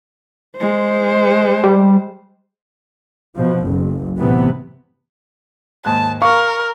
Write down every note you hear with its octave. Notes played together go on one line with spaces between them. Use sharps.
G#3 C5
G3
B2 F3
F#1 B1
A1 A2 C3 E3 B3
D#2 G#2 A5 F#6
A#4 F5 C#6